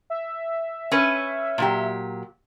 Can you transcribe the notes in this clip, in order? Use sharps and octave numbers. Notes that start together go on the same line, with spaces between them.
E5
C#4 B4
A#2 F#3 G4